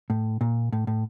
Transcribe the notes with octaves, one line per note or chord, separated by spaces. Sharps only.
A2
A#2
A2
A2